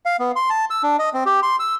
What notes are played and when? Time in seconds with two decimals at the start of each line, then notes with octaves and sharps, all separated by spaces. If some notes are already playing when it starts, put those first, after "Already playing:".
0.06 F5
0.19 B3
0.36 C6
0.50 A5
0.70 E6
0.83 D4
0.99 D#5
1.14 C4
1.26 G4
1.43 C6
1.60 E6